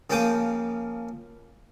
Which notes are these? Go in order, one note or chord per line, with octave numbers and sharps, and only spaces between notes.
C#3 F3 A#3 G5 D6 D#6